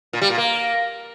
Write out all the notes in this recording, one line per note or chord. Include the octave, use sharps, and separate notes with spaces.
A#2
G3
A#2
A#3